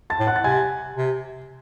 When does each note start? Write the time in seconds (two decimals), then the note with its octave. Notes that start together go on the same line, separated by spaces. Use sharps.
0.10 A5 A6
0.19 A2
0.27 F#5 F#6
0.36 A6
0.44 C3 G#5 G#6
0.96 C3